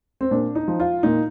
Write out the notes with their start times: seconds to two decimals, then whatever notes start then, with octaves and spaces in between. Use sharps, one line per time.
0.21 C4
0.31 A#2 D4
0.55 D#4
0.68 F3
0.80 F4
1.03 A#2 D#4